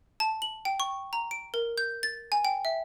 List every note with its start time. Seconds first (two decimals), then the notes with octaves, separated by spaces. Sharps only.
0.20 A5
0.42 F#7
0.65 G5
0.80 C#6
1.13 A#5
1.31 D7
1.54 A#4
1.78 G6
2.03 A6
2.32 G#5
2.45 G5
2.65 E5